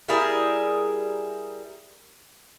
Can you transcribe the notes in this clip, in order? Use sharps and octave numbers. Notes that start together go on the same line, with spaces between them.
G3 E4 G#4 A#4